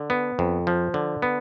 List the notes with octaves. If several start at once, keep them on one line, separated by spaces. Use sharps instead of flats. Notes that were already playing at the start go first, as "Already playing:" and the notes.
Already playing: D3
B3
F2
F3
D3
B3